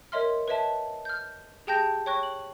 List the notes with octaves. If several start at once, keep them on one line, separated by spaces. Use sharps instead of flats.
A#4 C#5 D#5 E5 C6 F6
B4 C#5 D#5 E5 A5
F6 G6
G4 G#4 G5 A5 G6 A#6
C#5 G5 C#6 F#6 A#6
F#7